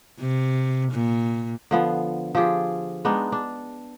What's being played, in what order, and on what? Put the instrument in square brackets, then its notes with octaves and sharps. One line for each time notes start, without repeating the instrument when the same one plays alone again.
[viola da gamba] C3
A#2
[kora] D3 F3 B3
F3 F4 G4 G#4
G#3 B3 D4 D#4
D4